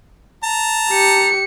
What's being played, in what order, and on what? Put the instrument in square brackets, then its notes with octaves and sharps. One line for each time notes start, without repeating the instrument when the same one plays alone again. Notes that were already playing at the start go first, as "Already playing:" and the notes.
[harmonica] A5 A#5
[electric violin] G4 C#7